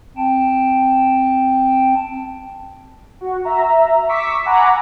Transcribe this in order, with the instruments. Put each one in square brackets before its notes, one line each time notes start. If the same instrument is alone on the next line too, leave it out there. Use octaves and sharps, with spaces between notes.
[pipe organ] C4 G5 A5
[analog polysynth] F#4
E5 A#5
C#6 D6 E6 B6
F#5 G#5 A#5 B5 D6